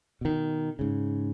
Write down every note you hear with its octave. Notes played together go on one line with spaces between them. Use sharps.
B2 D#3
G#2 C#3